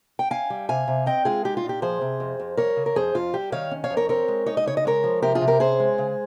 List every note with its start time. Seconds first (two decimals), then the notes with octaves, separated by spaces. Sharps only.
0.19 G5
0.31 C#4 F5 G#5
0.50 G3
0.69 C3 F5 G#5
0.88 C3
1.06 C4 D#5 G5
1.25 G#3 F4 G#4
1.45 D#4 G4
1.57 F4
1.64 A#2
1.69 G4
1.82 F3 G#4 C5
2.01 C3
2.20 F2
2.40 F2
2.57 G3 A#4 C#5
2.76 C#3
2.86 A#4
2.96 F2 G#4 C5
3.14 F2 F4
3.34 G3 G4
3.52 D#3 C#5 F5
3.71 C#4
3.84 C#5 F5
3.90 F2
3.97 A#4 C#5
4.09 C4 A#4 C#5
4.28 G#3
4.46 D#4 C#5
4.57 D#5
4.66 C#3 C#5
4.77 D#5
4.85 G#3 A#4 C#5
5.04 F3
5.22 C3 G4 A#4
5.35 F4 G#4
5.41 C3
5.47 G4 A#4
5.60 C#4 G#4 C5
5.80 G#3
5.98 C#3